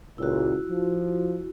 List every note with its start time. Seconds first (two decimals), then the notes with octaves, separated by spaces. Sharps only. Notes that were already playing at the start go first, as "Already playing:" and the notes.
0.18 C#2 A#2 E4 F#4
0.70 F3